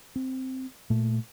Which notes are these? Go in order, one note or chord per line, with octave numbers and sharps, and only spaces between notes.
C4
A#2 A3